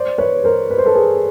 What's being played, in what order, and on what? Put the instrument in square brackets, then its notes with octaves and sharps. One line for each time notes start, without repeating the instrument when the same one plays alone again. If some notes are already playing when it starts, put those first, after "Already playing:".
Already playing: [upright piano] C5 D5
B4 C#5
A#4 C5
B4
C5
A4 B4
G#4 A#4